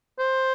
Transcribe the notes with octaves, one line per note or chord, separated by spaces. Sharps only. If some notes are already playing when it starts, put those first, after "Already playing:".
C5